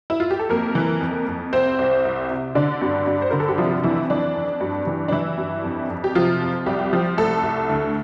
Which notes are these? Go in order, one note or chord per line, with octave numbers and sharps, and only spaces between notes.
E4
F4
G4
A4
F2 A#3 A#4
E3
F2
F2
C2 C4 C5
C2
C2
C3
D3 D4 D5
G2
G2
C5
D3 A#4
A4
G4
C3 F3 F4
F2 E3 E4
E3 D4
F2
G2
E3
D4
E3 E4
G2
F2
F2
G4
C3 F3 F4
F2
C2 G3 G4
F3
C2 A3 A4
C2
D2